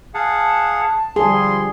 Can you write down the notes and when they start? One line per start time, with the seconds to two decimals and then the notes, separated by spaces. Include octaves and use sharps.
0.14 G#4 F5 F#5 A5
1.16 D3 F3 G3 G#4 C6